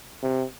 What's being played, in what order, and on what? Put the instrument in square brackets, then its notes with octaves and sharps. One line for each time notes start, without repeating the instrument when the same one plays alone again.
[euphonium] C3